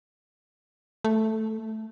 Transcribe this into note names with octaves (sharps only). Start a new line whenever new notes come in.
A3